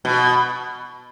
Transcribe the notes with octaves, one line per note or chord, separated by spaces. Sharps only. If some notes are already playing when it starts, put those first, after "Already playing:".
B2